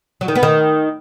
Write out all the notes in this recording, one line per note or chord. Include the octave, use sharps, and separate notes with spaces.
F#3
D#3
B3
D#3